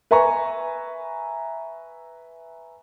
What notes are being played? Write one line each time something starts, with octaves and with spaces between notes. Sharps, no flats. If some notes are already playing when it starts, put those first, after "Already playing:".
B4 E5 G#5 A#5 C#6